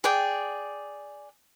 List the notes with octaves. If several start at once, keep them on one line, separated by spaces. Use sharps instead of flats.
G#4 D5 G5